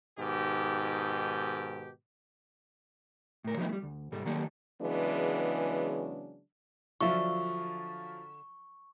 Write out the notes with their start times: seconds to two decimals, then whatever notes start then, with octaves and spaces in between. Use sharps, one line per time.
0.18 G#2 B2 D#3 G4
3.44 A2 A#4
3.57 F3 F#3 A3 B3 D#4 E4
3.69 G3 A3
3.83 D2
4.12 C2 G#2 G3 A4
4.25 D#3 F#3 A#3 G4 A4 D5
4.81 C#3 E3 F#3 G#3 B3 D4
7.01 D3 F3 F#3 F4 E5 C#6